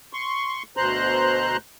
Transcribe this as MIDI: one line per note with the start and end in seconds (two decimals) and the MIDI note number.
0.13 0.63 84
0.13 0.63 85
0.77 1.57 38
0.77 1.57 47
0.77 1.57 72
0.77 1.57 82
0.77 1.57 84
0.77 1.57 90